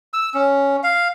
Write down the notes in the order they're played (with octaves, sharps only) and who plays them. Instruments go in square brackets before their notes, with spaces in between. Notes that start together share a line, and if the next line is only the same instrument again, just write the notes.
[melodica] E6
C#4
F5